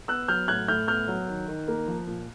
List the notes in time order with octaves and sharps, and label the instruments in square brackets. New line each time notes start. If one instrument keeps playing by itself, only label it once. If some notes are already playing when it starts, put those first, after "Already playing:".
[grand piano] B3 E6 F#6
F#3 F6 G6
A2 F#6 G#6
A2 F6 G6
B3 F6 G6
F#3
D#3
D#3
A#3
F3
A#2